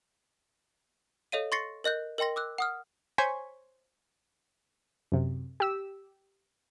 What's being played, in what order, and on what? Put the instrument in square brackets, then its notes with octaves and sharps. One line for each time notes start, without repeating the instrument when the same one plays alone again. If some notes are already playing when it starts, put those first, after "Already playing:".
[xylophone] A4 C#5 D#5 F5 D#7
C6 C#6 A6 A#6 C7 C#7
A#4 D#5 F#6 G6
A#4 D#5 G5 C6 A#6
D6 E6 F#6
F#5 D#6 F6
[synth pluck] C5 C#5 G#5 C#6 B6
[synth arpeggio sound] F#2 C3
G4 E6